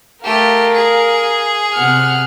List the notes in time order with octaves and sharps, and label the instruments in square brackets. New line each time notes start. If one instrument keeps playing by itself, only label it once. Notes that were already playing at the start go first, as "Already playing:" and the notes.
[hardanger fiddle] A3 G4 [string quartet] A#4 F5
[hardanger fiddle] G#4
[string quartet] C3 F#5 F6